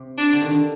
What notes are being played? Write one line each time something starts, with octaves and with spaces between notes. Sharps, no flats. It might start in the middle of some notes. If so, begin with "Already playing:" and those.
Already playing: C3
D4
D3
D#3
D3